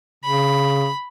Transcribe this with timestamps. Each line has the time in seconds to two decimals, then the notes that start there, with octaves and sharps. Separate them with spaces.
0.24 C#3 B5